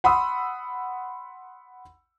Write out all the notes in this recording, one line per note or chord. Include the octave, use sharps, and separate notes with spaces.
F#5 B5 C6 D#6 E6